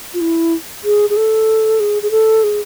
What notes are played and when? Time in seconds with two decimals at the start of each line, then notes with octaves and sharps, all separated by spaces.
0.14 F4
0.21 E4
0.84 G#4
1.10 G#4
1.17 A4
1.80 G#4
2.02 G#4
2.11 A4
2.44 G#4